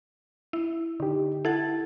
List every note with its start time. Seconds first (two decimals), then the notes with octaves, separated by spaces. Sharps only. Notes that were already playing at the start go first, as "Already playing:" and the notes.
0.53 E4
1.00 D3 D#4 G4
1.45 E4 A4 F#5 G#6 A6